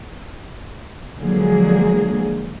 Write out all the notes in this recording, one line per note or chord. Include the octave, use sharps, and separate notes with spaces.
D3 F3 F#3 G#3 A#3 G#4